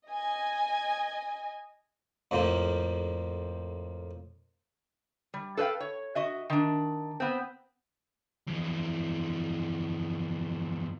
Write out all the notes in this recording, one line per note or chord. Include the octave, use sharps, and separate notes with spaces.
D#5 G#5
F2 A2 F3 A#3
G3
A4 B4 C#5 F5 G5
C#5
F#4 D#5 E5
D#3 D4
B3 C4
F2 E3